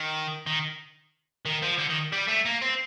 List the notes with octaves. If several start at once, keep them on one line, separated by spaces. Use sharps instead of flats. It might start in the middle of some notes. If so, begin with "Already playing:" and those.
Already playing: D#3
D#3
D#3
F3
D3
D#3
G3
A3
A#3
C4